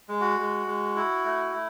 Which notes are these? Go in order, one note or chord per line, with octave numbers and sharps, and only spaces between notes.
G#3
F#4
G#3
G#3
E4
A3
A3